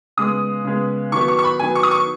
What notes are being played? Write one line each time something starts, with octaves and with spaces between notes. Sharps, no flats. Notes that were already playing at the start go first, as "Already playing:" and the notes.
C#3 G#3 B3 D#6
C#3 G#3 B3
D#3 F#3 B3 C#6
C#6
C#6
B5
D#3 F#3 B3 G#5
C#6
D#6
C#6